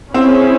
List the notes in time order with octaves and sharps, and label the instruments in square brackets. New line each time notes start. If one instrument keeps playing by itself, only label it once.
[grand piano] C4 [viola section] C#4 E4 G#4